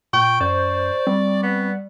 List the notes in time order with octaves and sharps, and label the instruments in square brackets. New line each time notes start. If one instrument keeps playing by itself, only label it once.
[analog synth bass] A#2 [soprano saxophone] G5 [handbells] C#6
[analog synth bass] F#2 [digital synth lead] C5 [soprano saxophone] D5
[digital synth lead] G3 [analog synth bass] C4
[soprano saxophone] B3